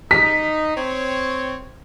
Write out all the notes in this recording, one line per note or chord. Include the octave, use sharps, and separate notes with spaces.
D#4 B6
C4 C#5